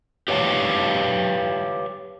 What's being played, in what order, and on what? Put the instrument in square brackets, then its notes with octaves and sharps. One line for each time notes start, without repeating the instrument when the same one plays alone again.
[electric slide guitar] G4 B4 C#5 F5 A5